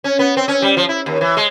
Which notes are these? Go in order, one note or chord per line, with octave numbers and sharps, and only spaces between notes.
C#4
B3
C4
C#4
G3
F3
E4
D#2
E3
G#3